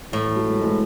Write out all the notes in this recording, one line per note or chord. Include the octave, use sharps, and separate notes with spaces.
A2 E3
E3
F#3
G#3
A3
E3 G#3